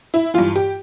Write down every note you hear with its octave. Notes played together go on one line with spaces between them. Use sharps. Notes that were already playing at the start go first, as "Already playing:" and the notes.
E4
G2 E3 F4
G4